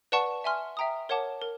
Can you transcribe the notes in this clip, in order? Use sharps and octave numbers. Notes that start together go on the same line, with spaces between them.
B4 D5 F#5 A5 C#6
E5 G#5 C6 F6
E5 G5 A#5 D#6
A#4 C#5 F#5 A5 D6
A#4